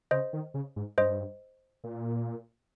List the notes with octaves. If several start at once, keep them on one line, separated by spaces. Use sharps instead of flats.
C#3 C5 D#5
D#3
C#3
G#2
G2 C5 D#5
A#2